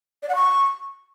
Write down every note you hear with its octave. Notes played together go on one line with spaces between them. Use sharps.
D5
F#5
C#6